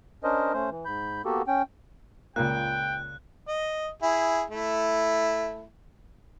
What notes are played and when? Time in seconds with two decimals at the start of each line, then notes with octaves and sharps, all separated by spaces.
0.24 C#4 D4 A#4 C5 D#5
0.53 A3 C#4 C5
0.70 E3
0.85 G#2 B5 G6
1.25 A#3 B3 F#4 G4 A4
1.47 C#4 G5
2.36 C#2 A#2 A#3 G5 F#6
3.48 D#5
4.03 E4 G#4
4.50 A3 E4